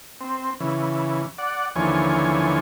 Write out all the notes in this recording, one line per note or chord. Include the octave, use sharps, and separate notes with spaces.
C4
C#3 E3
D5 F#5
D#2 D3 E3 F3 C#5 G#5